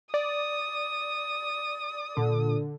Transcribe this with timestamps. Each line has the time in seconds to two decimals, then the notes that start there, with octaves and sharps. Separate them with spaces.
0.14 D5 D#6
2.17 A#2 D3 A4